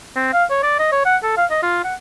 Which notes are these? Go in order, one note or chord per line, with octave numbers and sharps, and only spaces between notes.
C4
F5
C#5
D5
D#5
C#5
F#5
A4
F5
D#5
F4
F#5